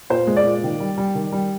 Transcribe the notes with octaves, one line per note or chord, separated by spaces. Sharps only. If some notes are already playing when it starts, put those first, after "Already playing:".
A#2 C5
G#3
D5
A#2
D#3
G3
G3
D#3
G3